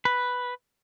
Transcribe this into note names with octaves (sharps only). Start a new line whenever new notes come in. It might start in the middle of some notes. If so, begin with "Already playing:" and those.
B4